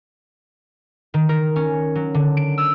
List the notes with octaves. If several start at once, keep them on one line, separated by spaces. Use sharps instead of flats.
D#3
A#4
C#4
F#3
D3
D7
E6